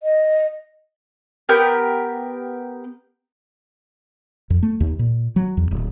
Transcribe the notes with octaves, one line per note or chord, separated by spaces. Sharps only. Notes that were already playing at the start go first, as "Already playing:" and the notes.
D#5
B3 G4 A#4 G6
F2
A3
D#2
A#2
F#3
E2
D1